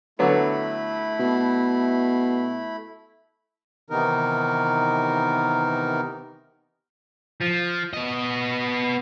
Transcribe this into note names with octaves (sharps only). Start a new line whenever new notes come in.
D3 F#3 A3 B3 E4 B5
B2
C3 D#3 E3 B3 D#4 A#4
F3
B3 D#5